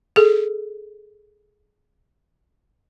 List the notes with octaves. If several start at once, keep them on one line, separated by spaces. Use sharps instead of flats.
G#4 A4